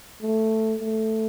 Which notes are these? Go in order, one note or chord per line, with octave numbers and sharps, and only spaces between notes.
A3
A3